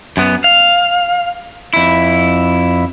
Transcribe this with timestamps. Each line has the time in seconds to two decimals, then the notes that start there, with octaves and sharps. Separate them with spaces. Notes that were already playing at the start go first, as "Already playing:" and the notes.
0.17 F#2 B3
0.44 F5
1.74 F2 E4